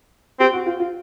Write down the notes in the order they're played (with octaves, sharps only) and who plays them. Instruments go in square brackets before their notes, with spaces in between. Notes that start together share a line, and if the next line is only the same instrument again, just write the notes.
[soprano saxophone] C4 [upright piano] G4
[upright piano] F#4
F4
F4